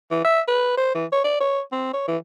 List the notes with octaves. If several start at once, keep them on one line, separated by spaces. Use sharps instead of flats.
E3
E5
B4
C5
E3
C#5
D5
C#5
C4
C#5
E3